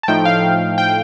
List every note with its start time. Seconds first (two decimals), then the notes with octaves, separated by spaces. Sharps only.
0.03 A5
0.08 A2 F3 A3 D#4 G5
0.25 F5
0.78 G5